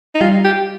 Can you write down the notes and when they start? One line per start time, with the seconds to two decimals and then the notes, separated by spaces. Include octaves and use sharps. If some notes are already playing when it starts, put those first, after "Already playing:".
0.15 D#4
0.21 G3 F4
0.44 G4